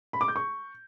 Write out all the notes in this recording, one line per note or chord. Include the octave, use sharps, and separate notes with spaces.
B5
D6
G6
C#6